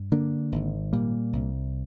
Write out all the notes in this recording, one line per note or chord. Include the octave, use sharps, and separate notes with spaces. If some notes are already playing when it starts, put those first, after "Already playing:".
Already playing: G2
D3 A#3 D4
G#1
A#2 G3 A#3
C2